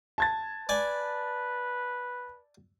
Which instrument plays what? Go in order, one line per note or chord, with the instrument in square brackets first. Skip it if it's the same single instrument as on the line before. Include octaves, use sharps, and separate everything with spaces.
[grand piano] A5 G#6 A6
[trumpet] B4 [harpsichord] D5 G#5